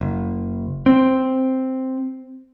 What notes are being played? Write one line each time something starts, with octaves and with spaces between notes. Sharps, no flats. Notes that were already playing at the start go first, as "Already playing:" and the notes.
F#1
C4